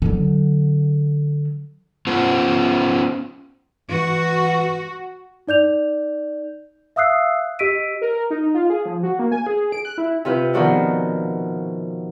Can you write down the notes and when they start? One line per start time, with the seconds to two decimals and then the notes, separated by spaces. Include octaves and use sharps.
0.02 D3 F#3
2.07 B3 C#4 F4 C5 F#5
3.90 E3 F#4
5.48 D#4 D5 G6 F7
6.96 E5 F5 D#6 E6 F#6 C7
7.59 G4 D#5 E6 B6 D7 D#7
8.02 A#4
8.30 D#4
8.54 F4
8.70 G#4
8.86 F3
9.03 F#4
9.19 A#3
9.31 G#5
9.47 G#4
9.72 D7
9.85 F#6
9.98 E4
10.25 C3 F4 B4 G6
10.53 B2 D#3 F3 F#4 C5 D5